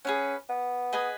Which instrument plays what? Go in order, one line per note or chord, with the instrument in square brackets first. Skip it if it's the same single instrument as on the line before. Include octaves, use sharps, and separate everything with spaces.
[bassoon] C#4 [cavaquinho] G#4 B4 F#5
[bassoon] B3
[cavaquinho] G#4 B4 D#5 G#5